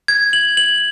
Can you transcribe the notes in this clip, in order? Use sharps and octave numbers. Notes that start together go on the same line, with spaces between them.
G#6
F#7
F#7